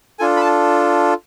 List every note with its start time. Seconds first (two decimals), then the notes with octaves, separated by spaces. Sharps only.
0.19 D4 F4 A4 G#5
0.36 B5
0.41 A5